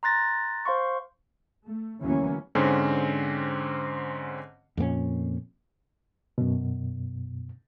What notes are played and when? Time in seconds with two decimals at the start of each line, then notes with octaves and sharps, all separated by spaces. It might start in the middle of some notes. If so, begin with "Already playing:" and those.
0.03 A#5 C6 F#6 A6 A#6
0.65 C5 F5 C6 C#6
1.64 A3
2.02 D2 E3 F#3 A#3 C#4
2.55 G#2 D3 C4 C#4
4.77 F2 A#2 A#3 C#4
6.38 F#2 B2